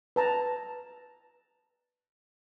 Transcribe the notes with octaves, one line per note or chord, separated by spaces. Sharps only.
B4 A5 A#5